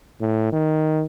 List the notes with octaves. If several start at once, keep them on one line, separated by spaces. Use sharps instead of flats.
A2
D#3